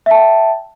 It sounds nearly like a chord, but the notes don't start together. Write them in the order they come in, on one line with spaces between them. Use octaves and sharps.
E5 A5 G5